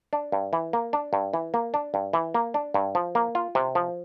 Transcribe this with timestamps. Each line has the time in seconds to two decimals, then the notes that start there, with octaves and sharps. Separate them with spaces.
0.13 D4
0.32 G2
0.53 E3
0.73 A#3
0.93 D4
1.13 G2
1.34 E3
1.54 A#3
1.74 D4
1.94 G2
2.13 E3
2.34 A#3
2.54 D4
2.74 G2
2.95 F3
3.15 A#3
3.35 F4
3.55 C3
3.75 F3